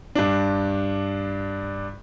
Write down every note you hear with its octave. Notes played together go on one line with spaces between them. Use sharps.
G2 D4